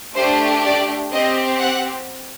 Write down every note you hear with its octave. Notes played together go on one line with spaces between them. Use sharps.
A3 D4 G4 C5
D5
C4 G4 D#5
F#5